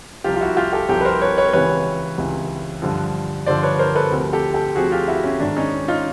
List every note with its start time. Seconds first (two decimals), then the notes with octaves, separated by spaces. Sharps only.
0.24 C2 C3 F3 F4 G4
0.36 F4
0.41 E4 F#4
0.57 F4 G4
0.73 G4 A4
0.89 C2 C3 F3 G4 A4
1.01 B4
1.05 A#4 C5
1.22 B4 C#5
1.38 B4 C#5
1.53 C#2 C3 E3 B4 C#5
2.18 C#2 C3 E3
2.82 G2 D3 F3
3.46 G2 D3 F3 C5 D5
3.63 B4 C#5
3.79 A#4 C5
3.95 A4 B4
4.11 D2 C3 F3
4.33 G4 A4
4.54 G4 A4
4.75 D2 C3 F3 F#4 G#4
4.92 F4 G4
5.08 E4 F#4
5.24 C#4
5.40 G#2 D#3 D4
5.56 C#4 D#4
5.88 D#4 F4